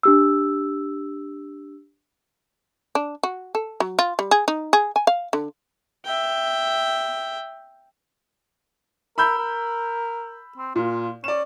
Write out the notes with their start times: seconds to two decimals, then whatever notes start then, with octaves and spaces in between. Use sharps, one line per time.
0.03 D4 G4 E6
2.95 D4
3.23 F#4
3.55 A4
3.80 F#3
3.99 F4
4.19 G3
4.31 G#4
4.48 D#4
4.73 G#4
4.96 G#5
5.07 F5
5.33 D3
6.05 E5 G5
9.18 A#4 B5 E6 G6
9.38 A#4
10.58 C4
10.76 A#2 F4
11.24 C#4 D5 E7